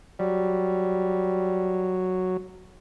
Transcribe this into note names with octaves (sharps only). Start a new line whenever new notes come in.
F#3 G3